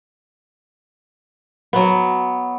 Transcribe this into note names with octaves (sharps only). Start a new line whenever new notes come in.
F#3 B3